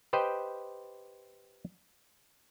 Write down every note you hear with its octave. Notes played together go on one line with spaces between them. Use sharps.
G4 B4 C5 D#5 G5